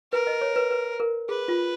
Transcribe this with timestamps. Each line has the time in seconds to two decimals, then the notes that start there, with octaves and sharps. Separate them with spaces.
0.12 A#4 B4
0.27 D#5
0.41 C#5
0.56 B4
0.71 B4
1.00 A#4
1.29 G#4 B4
1.48 F4